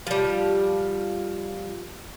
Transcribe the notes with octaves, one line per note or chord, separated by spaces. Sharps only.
F3 G3